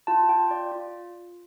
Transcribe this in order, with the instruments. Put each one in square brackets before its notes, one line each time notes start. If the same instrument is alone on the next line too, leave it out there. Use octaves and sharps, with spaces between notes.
[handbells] F4 A5
F4 G5
F4 D5
F4